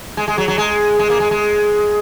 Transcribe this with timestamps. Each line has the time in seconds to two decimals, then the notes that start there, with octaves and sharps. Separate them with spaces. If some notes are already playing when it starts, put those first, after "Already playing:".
0.17 G#3
0.28 G#3
0.38 F#3
0.48 F#3
0.58 G#3
0.99 G#3
1.10 A#3
1.20 G#3
1.31 G#3